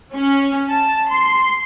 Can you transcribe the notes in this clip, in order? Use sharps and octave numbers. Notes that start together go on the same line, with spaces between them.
C#4
A5
C6